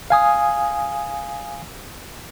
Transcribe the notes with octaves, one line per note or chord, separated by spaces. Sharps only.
F5 G#5 D#6